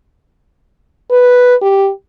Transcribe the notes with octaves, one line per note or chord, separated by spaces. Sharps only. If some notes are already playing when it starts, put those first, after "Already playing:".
B4
G4